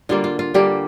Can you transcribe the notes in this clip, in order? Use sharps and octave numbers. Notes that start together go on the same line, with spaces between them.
D3 G3 A#3 F4
F4
F4
D3 G3 A#3 G4